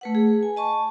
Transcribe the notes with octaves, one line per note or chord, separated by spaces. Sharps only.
A3 B4 F#5
G#4
G#5
D#5 A5 C#6